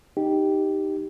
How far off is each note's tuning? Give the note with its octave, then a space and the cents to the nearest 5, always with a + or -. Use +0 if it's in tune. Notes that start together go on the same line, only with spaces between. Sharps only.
D#4 +0 G4 -5